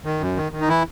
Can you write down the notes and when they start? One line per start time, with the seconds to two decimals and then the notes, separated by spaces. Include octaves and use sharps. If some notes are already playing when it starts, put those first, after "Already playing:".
0.05 D#3
0.21 F#2
0.37 D#3
0.52 D#3
0.61 D#4
0.68 E3 E4